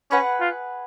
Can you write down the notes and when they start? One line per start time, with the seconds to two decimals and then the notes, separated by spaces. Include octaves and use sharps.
0.11 C#4 G#4 B4 F#5
0.40 F4